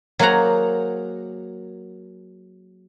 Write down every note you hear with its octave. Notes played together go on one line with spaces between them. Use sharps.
F#3 A#3 G#4 C5 F#5 A#5